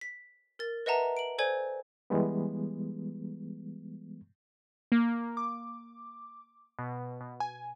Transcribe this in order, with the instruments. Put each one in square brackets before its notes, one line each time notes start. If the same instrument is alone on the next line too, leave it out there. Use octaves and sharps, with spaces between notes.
[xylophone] B6
A#4 A6
B4 D#5 E5 F#5 A5 A#5
D7 F#7
A4 C5 D5 G#5 G#6
[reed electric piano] E3 G3 G#3 B3
[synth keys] A#3
D6
B2
B2
G#5